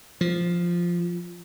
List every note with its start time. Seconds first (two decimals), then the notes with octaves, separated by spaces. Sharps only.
0.21 F3